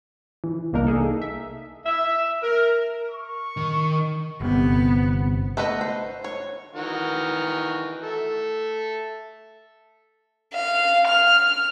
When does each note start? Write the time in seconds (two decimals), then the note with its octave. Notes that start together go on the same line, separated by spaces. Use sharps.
0.44 E3
0.73 C2 A#3 D4 D#4 A#4
0.87 A#3 D#4 G#4 A4
1.22 E5
1.85 E5
2.42 A#4
3.11 C#6
3.57 D#3
4.41 G1 C3 B3
5.57 A3 B3 B4 D#5
5.81 C5
6.24 C#5
6.74 D#3 E3 F#4
8.03 A4 E5
10.54 F5
11.08 F6